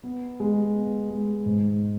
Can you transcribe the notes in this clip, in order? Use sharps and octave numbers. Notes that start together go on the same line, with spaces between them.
B3
G#3
B3
G#3
G#2